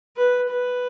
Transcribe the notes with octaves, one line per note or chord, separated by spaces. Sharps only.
B4
B4